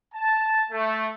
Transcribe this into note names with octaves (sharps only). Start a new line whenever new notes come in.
A5
A3